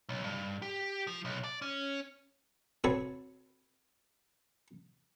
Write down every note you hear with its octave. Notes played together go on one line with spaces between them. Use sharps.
B1
G2
G4
F3
B1
D5
C#4
C4 F#4 A4 B4 C#5